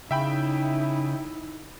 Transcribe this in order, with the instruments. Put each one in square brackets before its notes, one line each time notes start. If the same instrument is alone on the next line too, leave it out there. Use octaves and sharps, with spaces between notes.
[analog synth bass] C#3 [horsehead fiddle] D#4 E4 [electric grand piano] E5 G5 B5